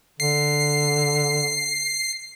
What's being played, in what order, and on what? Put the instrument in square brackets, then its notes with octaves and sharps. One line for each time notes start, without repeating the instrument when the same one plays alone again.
[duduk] D3 [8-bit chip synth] C7